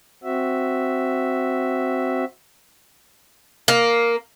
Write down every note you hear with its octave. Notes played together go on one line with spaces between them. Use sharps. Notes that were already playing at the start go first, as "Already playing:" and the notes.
C4 F#4 E5
A#3